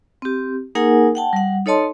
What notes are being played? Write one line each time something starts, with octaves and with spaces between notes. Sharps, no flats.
C4 G4
A#3 D#4 G#4 A#4 F#5 G#5
F#5 G5 A5
G3 F#5
D#4 A4 C#5 D#5 A5 C6